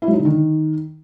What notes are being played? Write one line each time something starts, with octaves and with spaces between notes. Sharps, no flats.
E4
F#3
D#4
D3
D#3